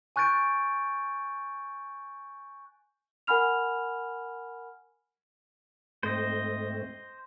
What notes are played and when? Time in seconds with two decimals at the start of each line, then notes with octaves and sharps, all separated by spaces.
0.16 G#5 C#6 F#6 G6 A6 D7
3.27 A#4 F#5 G#5 B5 F6 F7
6.03 G#2 A3 C4 C5 D#5